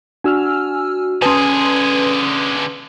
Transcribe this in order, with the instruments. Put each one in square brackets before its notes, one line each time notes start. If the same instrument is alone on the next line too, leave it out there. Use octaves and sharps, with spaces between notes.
[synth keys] D4 F#4 [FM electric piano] G#5 E6 F6
[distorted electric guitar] D3 G#4 [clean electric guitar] C#4 G#5 [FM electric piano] B4 A5 C6 [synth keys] D#6